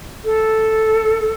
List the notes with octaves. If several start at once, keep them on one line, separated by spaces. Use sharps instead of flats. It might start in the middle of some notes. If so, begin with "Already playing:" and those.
A4